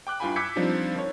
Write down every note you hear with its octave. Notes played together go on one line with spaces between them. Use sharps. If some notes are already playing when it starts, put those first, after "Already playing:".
G5 D6 F#6
G2 E4 F4 G5 G#5 B5
D6 E6 G6 G#6 B6 C#7
F3 G3 C4 D4 D#4
D#3 C#5